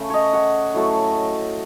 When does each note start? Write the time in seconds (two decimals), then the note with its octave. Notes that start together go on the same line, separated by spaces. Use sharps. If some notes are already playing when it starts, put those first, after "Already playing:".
Already playing: C#3 A3
0.10 C#5 D#5
0.33 F#5
0.74 A2 F#3 A3